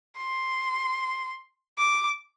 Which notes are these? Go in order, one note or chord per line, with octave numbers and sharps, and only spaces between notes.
C6
D6